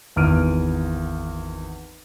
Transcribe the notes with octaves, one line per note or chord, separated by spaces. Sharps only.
G#1 E2 F6 D7 D#7